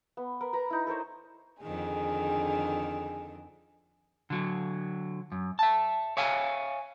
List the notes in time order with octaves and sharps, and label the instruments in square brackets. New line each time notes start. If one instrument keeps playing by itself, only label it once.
[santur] B3
A#4 B4
B4 A#5 B5
D#4 E4
A4 A#4 C5 C#5
[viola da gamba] F2 D3 D#3 [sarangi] G#4
[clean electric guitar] D3 F#3
F#2
E5 A5
C#5 E5 F5 G#5